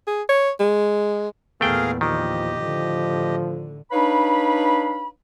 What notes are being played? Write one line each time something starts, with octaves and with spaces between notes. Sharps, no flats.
G#4
C#5
G#3
E2 A#2 A3 B3 G#4 A#4 F5 G5
D#3 F3 G4 D#5
A2 D3 F3
D4 D#4 B4 C#5 F5 B5